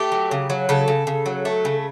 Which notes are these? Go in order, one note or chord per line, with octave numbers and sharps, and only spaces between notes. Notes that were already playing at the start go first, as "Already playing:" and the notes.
Already playing: A3 G4
F#3
C#3
F#3
C#3 A4
C#3
C#3
F#3
A3
C#3